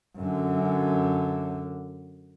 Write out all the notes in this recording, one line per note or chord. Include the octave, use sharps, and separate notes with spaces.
F#2 D3